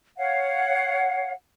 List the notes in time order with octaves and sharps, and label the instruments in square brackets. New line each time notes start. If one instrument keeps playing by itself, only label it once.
[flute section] C#5 F5 F#5